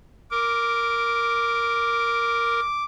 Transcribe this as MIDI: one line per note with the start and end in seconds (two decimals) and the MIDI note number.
0.31 2.60 70
0.31 2.84 86